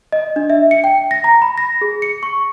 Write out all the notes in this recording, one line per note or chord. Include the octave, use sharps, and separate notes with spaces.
D#5
D4
E5
C#7
G5
A#6
A#5
B5
A#6
G#4
C#7
C#6